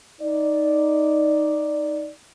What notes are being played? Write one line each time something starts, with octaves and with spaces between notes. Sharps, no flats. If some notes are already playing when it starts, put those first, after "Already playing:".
D#4 D5